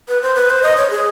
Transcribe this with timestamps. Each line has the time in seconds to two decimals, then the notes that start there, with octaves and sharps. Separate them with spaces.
0.09 B4
0.22 C5
0.35 B4
0.50 C5
0.63 D#5
0.77 C#5
0.91 G#4